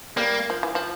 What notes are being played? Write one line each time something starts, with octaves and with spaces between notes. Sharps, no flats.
G3 A#3
F3
E3
F3